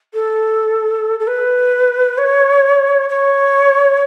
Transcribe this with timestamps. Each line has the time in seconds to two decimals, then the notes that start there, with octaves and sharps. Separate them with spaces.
0.14 A4
1.19 A4
1.27 B4
2.18 C#5
3.09 C#5